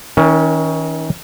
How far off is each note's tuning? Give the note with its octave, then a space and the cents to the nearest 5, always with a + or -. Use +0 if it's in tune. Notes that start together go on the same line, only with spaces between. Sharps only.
D#3 +40 C#4 +10 A#4 +0